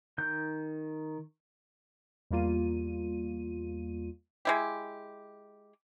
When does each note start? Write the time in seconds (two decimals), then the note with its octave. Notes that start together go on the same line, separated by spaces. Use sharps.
0.18 D#3 G6
2.31 E2 G3 A#3 F4 D#7
4.45 G#3 E4 G4